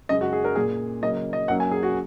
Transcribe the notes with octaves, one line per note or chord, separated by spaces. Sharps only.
F#2 C#3 G#3 D#5
F#4
G#4
A#4
A#2 A#3 G#4
C#3 F#3 A#3 D#5
D#5
F#2 F#3 A#3 F#5
G#5
G#4
F#4